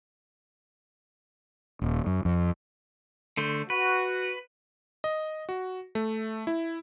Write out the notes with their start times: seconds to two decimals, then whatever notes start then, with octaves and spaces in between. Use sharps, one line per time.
1.81 D#1
2.06 F#2
2.25 F2
3.37 D3 A3 C5
3.70 F#4 B4
5.04 D#5
5.49 F#4
5.95 A3
6.47 E4